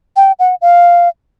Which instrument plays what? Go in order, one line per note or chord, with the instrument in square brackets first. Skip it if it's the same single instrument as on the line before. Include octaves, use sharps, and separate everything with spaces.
[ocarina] G5
F#5
F5